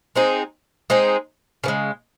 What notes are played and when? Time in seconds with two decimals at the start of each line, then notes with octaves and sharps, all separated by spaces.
0.15 G#3 C4 D#4 G#4
0.90 G#3 C4 D#4 G#4
1.64 C#3 E3
1.68 G#3